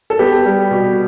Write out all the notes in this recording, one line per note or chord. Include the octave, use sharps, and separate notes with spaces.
A4
B3 G4
G3
B2